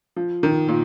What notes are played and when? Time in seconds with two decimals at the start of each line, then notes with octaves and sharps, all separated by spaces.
0.16 F3
0.43 D#3
0.68 A#2